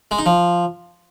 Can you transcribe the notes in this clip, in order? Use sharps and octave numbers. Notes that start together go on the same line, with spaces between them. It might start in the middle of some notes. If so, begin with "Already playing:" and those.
G#3
D#4
F3